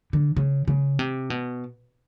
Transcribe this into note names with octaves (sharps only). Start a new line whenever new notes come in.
D3
C#3
C#3
C3
B2